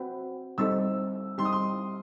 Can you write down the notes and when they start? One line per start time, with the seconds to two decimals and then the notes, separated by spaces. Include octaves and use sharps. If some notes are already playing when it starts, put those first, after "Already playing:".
Already playing: C4 F#4 B4 E5 G5
0.58 G3 C4 D#4 A4 E6
1.38 G3 C4 D#4 G4 C6
1.45 D#6
1.52 C6